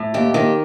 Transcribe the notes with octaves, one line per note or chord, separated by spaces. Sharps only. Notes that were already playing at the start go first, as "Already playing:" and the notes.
Already playing: A2
D#2 G4
D#3 G4